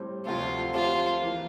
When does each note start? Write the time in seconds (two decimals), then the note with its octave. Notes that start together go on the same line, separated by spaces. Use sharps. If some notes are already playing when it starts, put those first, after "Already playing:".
Already playing: A2 G3 C4
0.26 D2 C3 F3 A3 F4
0.74 F3 A3 C4 F4 G4 C5
1.22 E3 A#3